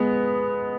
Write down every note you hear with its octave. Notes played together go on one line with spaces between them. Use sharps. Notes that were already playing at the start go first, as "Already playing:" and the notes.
Already playing: G#3 B3